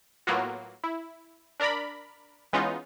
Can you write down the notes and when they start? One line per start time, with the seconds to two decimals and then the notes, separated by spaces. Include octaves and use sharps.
0.27 A2 F#3 A#3 B3 F4 F#4
0.84 E4
1.60 D4 A#4 D5 A#5 B5
2.53 E3 G#3 B3 C#4 D#4 F4